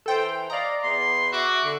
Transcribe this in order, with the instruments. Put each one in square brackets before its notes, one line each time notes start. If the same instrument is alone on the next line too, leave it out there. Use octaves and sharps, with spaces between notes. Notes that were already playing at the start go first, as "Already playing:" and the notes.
[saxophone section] E3 C5 [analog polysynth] A4 G5
[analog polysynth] D5 A#5 [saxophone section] D#5 F5
[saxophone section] E2 B3 [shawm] C6
[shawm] F#4 [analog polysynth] E5 D6
[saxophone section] D3